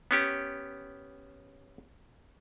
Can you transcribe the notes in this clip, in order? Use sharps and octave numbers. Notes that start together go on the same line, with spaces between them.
B3 C#4 G4